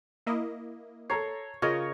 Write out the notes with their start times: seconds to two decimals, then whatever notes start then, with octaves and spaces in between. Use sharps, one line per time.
0.27 A#3 E4 D#5
1.10 A4 C#5 A#5 C7
1.62 C#3 F4 A#4 C#5 D#5